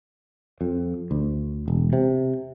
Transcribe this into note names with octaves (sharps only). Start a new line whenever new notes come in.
F2
D2
E1
C3